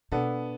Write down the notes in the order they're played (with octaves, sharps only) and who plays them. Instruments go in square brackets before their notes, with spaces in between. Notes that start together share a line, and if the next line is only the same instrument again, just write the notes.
[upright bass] B2 [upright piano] B3 D4 A4